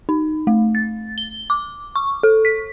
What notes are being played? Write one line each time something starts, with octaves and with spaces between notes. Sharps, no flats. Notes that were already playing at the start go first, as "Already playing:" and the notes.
D#4
A3
A6
G7
D6
C#6
A4
B6